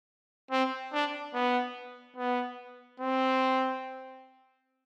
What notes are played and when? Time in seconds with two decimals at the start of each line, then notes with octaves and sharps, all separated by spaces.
0.51 C4
0.93 D4
1.34 B3
2.16 B3
3.00 C4